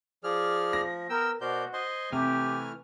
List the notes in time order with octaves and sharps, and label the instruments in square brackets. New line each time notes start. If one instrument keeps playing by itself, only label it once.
[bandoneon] F3 [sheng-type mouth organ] G#4 D5 F6
[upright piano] A#6
[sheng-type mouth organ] B3 G5 [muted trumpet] A#4 [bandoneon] E6
[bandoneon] B2 G6 [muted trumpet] F#4 [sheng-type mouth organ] A#4 C5 D5
[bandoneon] C5 D#5 C6 [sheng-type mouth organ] G#5
[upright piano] C3 [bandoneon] E3 A3 F6 [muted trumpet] G4